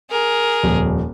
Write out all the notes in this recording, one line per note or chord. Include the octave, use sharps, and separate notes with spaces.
G#4 A#4
D#1 F2